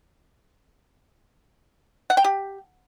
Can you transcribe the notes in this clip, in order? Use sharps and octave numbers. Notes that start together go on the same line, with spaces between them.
F#5
G5
G4